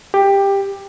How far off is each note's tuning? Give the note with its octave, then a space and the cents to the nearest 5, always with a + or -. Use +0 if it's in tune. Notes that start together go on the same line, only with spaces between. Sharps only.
G4 +10